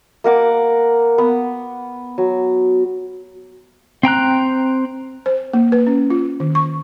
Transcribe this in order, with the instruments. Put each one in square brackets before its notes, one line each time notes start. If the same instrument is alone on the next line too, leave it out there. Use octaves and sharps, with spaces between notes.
[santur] A#3 A#4 F#5 D6
B3
F#3
[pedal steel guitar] C4 G5 A#5 F#6
[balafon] C5
A#3
B4
C#4
F4
D#3
C#6